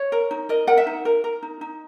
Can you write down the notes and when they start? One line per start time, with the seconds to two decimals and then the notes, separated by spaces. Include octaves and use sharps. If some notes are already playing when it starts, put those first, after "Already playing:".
Already playing: C#5
0.12 A#4
0.31 D#4
0.49 A#4 D#5
0.67 A#4 F#5
0.77 E5
0.87 D#4
1.05 A#4
1.24 A#4
1.43 D#4
1.61 D#4